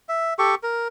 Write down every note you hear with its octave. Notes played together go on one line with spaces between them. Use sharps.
E5
G4 A4 C#6
A#4